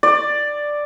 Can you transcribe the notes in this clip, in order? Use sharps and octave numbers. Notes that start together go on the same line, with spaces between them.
D5